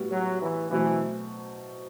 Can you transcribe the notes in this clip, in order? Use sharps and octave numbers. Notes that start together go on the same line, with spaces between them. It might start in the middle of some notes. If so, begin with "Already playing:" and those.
Already playing: A2 G3 B3 F#4
F#3
E3
B2 E3 F#3 A3 C4